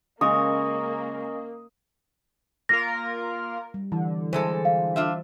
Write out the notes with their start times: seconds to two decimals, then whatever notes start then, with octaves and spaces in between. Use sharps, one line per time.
0.21 C#3 G#3 A#3 C#4 D#5 C#6 D#6
2.69 A#3 F4 A#4 A#6
3.74 G3
3.92 D3 E3
4.33 E3 G#3 A4 C5
4.65 F5
4.96 D4 F4 E5